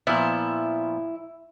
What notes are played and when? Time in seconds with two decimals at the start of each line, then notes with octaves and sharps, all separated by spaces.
0.07 A#2 F3 B3 E4